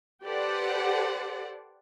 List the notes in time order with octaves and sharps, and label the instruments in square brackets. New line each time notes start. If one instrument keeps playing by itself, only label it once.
[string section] G4 A4 B4 C5 D5 F#5